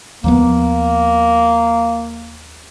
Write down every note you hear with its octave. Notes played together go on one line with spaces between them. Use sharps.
D#2 F3 A#3 B3